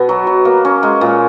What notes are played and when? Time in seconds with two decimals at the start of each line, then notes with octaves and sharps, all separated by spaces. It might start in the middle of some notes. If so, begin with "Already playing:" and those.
Already playing: B2 B3
0.09 F#3
0.27 F#3
0.45 A#3
0.65 C#4
0.83 G#3
1.01 A#2